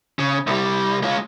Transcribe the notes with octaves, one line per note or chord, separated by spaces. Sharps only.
C#3
C2 G3
G#3 F4